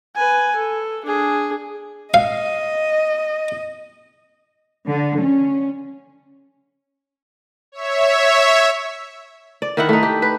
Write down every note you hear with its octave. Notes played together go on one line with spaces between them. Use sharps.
B4 G#5
A4
D4 G#4
D#5 F5
D3
C#4
C#5 E5
D5
D#3 E4 F#5
A3 D#4
G4
B4